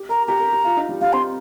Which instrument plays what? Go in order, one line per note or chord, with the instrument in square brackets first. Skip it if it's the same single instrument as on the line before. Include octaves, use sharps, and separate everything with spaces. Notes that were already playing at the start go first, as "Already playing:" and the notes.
Already playing: [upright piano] G4
[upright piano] A#4 [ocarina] A#5
[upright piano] G4 [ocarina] A#5
[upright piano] A#4
G4
F4
D#4
G3
[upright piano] G3 [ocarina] F5
[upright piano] C4 [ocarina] C6